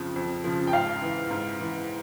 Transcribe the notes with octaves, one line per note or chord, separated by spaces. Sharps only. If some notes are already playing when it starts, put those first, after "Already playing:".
Already playing: F2 C#3 F3
F2
C#3 F3
G5
G#2 F5
E3
G#2
E3